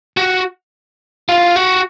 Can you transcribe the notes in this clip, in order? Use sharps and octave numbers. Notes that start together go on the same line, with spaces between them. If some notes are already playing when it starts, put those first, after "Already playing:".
F#4
F4
F#4